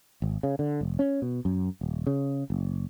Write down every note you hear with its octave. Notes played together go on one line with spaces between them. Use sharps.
G#1
C#3
D3
F1
C#4
B2
F#2
D#1
C#3
F#1